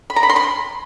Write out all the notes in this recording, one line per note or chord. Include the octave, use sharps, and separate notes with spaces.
B5
A#5
B5
C6
B5